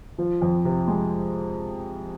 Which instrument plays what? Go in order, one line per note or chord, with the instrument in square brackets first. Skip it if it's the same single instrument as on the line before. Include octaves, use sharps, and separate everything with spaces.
[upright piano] F3
F2
C3
G#3